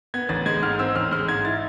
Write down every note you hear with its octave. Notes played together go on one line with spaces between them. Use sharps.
B3 G#6
A1 A6
G#3 G#6
G#2 F6
C4 E6
A1 F6
G#3 F6
G#2 G#6
E4 A6